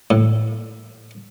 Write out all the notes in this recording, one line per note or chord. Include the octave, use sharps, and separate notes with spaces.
A2